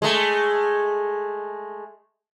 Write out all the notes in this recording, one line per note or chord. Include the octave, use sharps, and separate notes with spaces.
G#3 A3